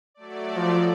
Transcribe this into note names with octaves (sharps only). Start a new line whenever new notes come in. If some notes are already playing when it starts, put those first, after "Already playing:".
F#3 A3 D5
F3